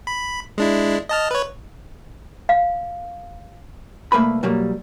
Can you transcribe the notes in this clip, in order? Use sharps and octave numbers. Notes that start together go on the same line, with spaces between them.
B5
G#3 D4 E4
D#5 A5 F6
B4 C#5
F5
C2 A3 A#3 B4 B5
B2 F#3 G3 A#3